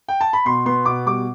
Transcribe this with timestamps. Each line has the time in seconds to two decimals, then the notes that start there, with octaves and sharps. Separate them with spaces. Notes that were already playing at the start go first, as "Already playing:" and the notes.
0.08 G5
0.21 A5
0.33 B5
0.45 B2 C6
0.66 B3 C6
0.85 B2 D6
1.06 G3 D6